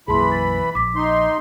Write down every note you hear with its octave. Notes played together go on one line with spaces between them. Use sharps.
B1 F#2 E3 A#3 G#4 A5 B5 C6
A6
A#1 D6 B6
D#4 C6